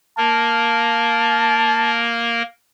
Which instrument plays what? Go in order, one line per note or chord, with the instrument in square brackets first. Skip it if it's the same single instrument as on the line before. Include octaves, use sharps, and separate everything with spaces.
[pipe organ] A#3 A#4 [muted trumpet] A5